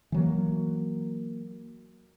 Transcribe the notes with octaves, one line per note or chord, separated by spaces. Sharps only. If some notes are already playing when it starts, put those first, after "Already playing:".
E3 F#3 A#3